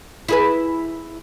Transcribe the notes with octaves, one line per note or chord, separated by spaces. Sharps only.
E4 G#4 B4